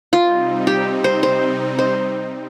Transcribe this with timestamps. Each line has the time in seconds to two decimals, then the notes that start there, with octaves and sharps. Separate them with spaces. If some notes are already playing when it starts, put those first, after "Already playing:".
0.12 C3 G3 C4 D#4 F4
0.67 G4
1.04 C5
1.23 C5
1.79 C5